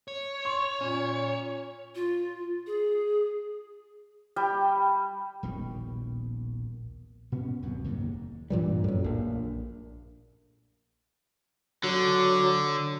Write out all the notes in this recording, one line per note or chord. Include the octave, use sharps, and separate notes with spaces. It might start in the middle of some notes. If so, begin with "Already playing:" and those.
C#5
C6 C#6
A#2 C#4
F4
G#4
G3 G5
D#1 A#1 B2 D#3
A#2 B3 C#4
D1 C2 F#2 F#3
F#1 D#2 G#2
G2 A#2 E3 G3
F#2 A2
A#1 A#2
D3 F#3